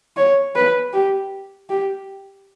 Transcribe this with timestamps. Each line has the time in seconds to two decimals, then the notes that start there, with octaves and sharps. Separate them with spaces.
0.17 C#5
0.55 B4
0.93 G4
1.70 G4